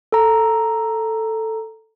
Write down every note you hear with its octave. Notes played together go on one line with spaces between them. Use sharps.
A4 A#5